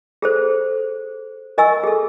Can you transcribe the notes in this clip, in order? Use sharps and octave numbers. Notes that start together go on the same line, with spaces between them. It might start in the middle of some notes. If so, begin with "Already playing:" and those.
G#4 A4 C5
A#4 D#5 G#5 C#6 E6
G#4 A4